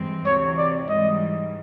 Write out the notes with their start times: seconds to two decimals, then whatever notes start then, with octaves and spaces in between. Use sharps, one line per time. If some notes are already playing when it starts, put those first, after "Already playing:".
Already playing: G2 E3 G#3 C4
0.26 D2 C3 E3 C#5
0.58 D5
0.89 G#2 E3 G3 D#5